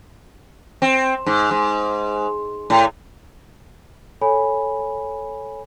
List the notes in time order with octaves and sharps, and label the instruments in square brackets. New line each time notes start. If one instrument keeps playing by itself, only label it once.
[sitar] C4
G#2
G#2
A2
[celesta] A4 C#5 G#5 B5